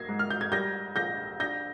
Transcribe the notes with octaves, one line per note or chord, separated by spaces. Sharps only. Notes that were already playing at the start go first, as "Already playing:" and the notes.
Already playing: A#3 G#6 A#6 C7
G#2
F6
G6
G#6
G3 G6 A#6
A#1 G6 A#6
D4 G6 A#6